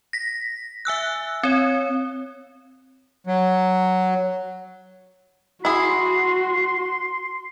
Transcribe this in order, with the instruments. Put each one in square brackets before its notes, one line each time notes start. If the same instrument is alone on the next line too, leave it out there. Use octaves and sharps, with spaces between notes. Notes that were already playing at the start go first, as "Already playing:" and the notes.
[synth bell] A#6 B6
E5 G#5 E6 F#6
C4 C#5
[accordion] F#3
[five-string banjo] E4 G#4 [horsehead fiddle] F#4 [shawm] C6